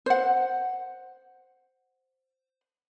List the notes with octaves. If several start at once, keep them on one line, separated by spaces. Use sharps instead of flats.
C5 F#5